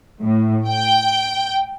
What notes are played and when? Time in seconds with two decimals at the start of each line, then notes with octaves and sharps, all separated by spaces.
0.20 A2
0.68 G5